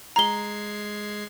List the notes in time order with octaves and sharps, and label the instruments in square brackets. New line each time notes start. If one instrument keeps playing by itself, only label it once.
[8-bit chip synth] G#3 G#6 C7 [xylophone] A#5 G7